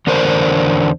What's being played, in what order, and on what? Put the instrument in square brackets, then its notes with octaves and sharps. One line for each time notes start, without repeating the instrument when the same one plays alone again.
[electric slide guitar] E2 D3 D4 A#4 C5